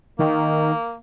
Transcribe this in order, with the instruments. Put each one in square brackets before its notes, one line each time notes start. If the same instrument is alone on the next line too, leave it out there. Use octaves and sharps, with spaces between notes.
[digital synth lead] D#3 [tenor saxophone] A#3